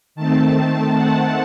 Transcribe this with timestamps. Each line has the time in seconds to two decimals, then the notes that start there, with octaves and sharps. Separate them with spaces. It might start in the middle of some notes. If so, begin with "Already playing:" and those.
0.15 D#3 A3 C4 A5
0.93 F#5